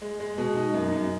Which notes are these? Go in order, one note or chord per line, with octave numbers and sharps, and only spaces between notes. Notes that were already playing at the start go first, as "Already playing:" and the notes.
G#3
G#3
B2
D#4
F#2
F#2